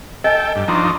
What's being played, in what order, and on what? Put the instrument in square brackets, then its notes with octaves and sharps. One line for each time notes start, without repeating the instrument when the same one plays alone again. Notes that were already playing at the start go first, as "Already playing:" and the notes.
[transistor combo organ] A4 G5 [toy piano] D#5 G#5
[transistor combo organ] G2
[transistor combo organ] F3 D4 D#4 [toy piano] A#5 C6 C#6